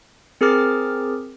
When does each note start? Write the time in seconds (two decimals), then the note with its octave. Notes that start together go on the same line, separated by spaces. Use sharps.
0.41 C4 G#4 A#4 D6 F6 A6